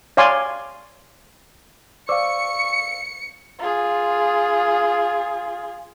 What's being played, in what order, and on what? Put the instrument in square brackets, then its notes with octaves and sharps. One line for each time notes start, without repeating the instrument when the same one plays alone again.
[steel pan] C#5 D5 F5 G#5 C6
[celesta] C5 D5 D6 [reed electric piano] F5 E6 [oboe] C#6 [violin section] C#7
[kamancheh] F4 G#4